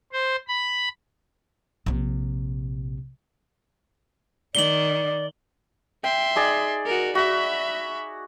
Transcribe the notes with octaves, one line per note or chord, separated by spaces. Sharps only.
C5
B5
A#1 C3
D#3 D5 F#7 G7
E5 G5 C6
D#4 G#4 D5
F#4 A#4
F#4 E5 B5